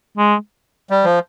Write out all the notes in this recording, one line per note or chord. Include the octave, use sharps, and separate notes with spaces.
G#3
G3
F3